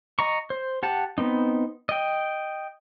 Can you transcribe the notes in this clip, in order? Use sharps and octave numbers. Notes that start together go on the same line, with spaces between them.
D#5 A#5 C#6
C5
G4 F#5 A5
B3 C4 D#4
D#5 G5